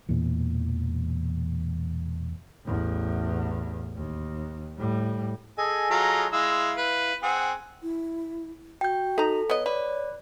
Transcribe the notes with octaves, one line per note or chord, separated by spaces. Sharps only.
E1 E2 A#2 E3
A1 E2
D#2
A2 G3
G#4 A4 D#5 G#5
F#3 F4 A#5
G#3 E4 F5 E6
B4
C4 G#4 F#5
E4
F#4 G5 G6
D#4 A4 A#5
B3 C#5 D#5
B4 D5